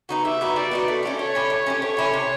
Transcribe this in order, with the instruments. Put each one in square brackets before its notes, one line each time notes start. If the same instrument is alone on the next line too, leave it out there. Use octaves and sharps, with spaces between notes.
[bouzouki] B3 D#4 F#4
[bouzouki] G3 [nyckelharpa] E5
[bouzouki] B3 D#4 F#4
[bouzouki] G3 [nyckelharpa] D5
[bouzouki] B3 D#4 F#4
A3
C#4 E4 G4
[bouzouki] A3 [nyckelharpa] C#5
[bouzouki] C#4 E4 G4
A3
C#4 E4 G4
[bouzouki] A3 [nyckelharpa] C#5
[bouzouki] C#4 E4 G4
C3